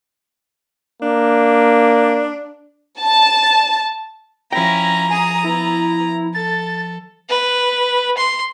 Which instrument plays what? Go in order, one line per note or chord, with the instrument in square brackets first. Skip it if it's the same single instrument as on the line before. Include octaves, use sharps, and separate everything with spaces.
[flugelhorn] A#3 [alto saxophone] D4
[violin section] A5
[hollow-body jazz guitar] F3 G5 [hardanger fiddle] C#4 E4 [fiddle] A#5 [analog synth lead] A#6
[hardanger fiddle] G#4 D#6 [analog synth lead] G#5
[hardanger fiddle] B3 [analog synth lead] E4
[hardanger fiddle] A4 [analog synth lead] A6
[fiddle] B4
C6